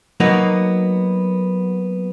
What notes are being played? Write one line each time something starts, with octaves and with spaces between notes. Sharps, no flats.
F#3 A#3 B3 D#4